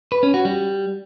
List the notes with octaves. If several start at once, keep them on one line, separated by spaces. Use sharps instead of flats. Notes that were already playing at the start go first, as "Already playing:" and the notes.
B4
C#4
F#4
G3